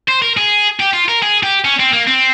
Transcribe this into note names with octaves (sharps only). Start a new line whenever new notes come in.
C5
A#4
G#4
G4
F4
A#4
G#4
G4
C#4
C4
A#3
C4